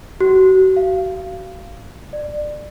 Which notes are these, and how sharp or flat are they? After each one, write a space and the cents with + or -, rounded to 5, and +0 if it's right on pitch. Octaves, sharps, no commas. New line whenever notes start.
F#4 +35
F5 -20
D5 +20